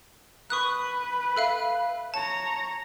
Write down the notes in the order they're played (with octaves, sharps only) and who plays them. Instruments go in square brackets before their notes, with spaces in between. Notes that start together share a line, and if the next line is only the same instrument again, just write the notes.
[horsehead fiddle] B4 [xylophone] C#6 D#6 F#6
[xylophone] A4 E5 F5
[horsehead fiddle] C#5 A#5 [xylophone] A5